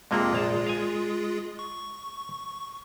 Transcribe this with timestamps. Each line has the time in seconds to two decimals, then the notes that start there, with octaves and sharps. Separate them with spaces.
0.11 F2 C3 G#3 A#3 F4 G#4
0.33 A#1 F5 A5
0.66 F5 G#5
1.59 C#6